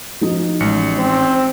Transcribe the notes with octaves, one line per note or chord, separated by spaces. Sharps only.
F3 D#4 F#4
A1 G#3 C#7
C4 C5